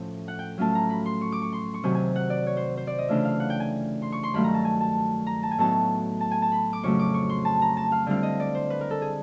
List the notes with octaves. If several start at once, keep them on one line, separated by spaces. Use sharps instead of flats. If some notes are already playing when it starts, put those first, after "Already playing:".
Already playing: A2 F3 A3 C#4
F#5
G5
A2 F#3 A3 C#4 F4 A5
A#5
B5
C6
C#6
D6
C#6
C6
C#6
C3 D#3 F#3 G#5
G#5
F#5
D5
C#5
C5
C5
D5
D#5
C#3 E3 A3 D4 F4 E5
F5
F#5
G5
G#5
C6
C#6
C6
G2 D#3 F#3 A3 B5
A#5
A5
G#5
A5
A#5
A5
G#5
A2 F#3 B3 D#4 A5
A5
G#5
A5
B5
D6
F2 C#3 F#3 A3 C#6
D6
C#6
C6
A5
A#5
A5
F5
D3 G3 C4 E4 F5
D#5
D5
C5
B4
A#4
A4
G#4